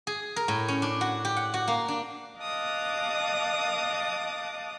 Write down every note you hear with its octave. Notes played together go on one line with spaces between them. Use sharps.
G#4
A#4
A2
C#4
D4
F#4
G4
F#5
F#4
A#3
D4
D#5 F5 A5 D6 D#6 F#6